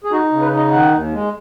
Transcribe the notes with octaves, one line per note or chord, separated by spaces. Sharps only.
G#4
D#4 F#4
C#3
B4
D#4
D#5
D#3 F#5
D#2
G#3